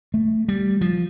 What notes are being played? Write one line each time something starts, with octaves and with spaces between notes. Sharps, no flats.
A3
G3
F3